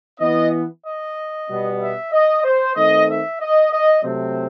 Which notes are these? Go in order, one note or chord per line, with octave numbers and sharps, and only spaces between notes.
E3 B3 D#5
D#5
B2 G3 B3
E5
D#5
C5
D#3 A3 C4 D#5
E5
D#5
D#5
C3 F#3 A3 C4